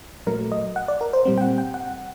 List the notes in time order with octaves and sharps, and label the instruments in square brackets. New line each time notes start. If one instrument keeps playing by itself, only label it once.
[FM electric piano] A#2 F#3 A3 A#4
D#5
F#5
D5
A#4
C5
A#2 G3 C4
G5
F#5
G5
F#5